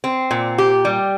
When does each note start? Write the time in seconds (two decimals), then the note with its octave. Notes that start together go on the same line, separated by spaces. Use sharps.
0.04 C4
0.31 A#2
0.58 G4
0.85 G3